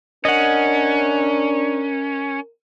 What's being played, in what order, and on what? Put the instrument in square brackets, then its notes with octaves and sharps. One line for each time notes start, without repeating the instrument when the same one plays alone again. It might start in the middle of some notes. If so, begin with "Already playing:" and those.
[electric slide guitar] C#4 [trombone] D4 [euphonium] A#4 [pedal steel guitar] D#5 F#5